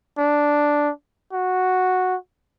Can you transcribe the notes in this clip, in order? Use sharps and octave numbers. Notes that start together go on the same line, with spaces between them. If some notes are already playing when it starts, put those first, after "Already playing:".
D4
F#4